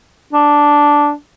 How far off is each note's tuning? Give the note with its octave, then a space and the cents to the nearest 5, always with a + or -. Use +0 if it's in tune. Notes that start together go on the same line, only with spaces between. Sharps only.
D4 -5